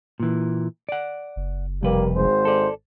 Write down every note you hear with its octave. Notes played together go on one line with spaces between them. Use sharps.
A#2 E3
D5 F#5
F#1
C2 F2 G3 A#3 B4
G#1 G#3 C5
A4 D5